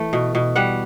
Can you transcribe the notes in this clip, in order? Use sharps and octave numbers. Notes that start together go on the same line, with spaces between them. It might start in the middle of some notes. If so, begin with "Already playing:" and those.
Already playing: E3 A3
B2
B2
G3 F#5